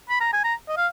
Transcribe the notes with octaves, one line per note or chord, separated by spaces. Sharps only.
B5
A#5
G#5
A#5
D#5
F5